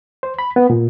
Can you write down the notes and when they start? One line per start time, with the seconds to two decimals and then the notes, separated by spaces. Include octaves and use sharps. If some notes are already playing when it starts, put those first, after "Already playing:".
0.23 C5
0.39 B5
0.56 B3
0.70 A#2